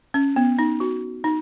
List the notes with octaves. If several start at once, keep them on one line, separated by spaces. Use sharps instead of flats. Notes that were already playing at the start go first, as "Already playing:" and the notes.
C#4
B3
D#4
F#4
D#4